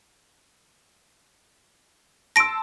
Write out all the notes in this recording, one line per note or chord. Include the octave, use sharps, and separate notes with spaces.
A5 C6 E6 A#6 D7